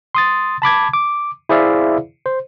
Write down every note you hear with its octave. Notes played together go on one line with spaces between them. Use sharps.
C6 D#6 A6
A5 B5 D6 G#6
D6
E4 G#4 C5 D5 E5 F5
C5